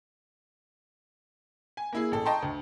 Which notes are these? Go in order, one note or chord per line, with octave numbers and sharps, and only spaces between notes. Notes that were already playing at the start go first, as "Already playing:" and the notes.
G#5
A#3 E4 G#4
A1 A4
D#5 G5 A5 A#5 C6 C#6
D2